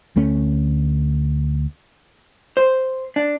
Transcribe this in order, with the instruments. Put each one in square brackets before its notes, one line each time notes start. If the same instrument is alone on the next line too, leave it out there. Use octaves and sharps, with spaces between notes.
[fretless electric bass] D2 A3 C#4
[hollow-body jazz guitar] C5
D4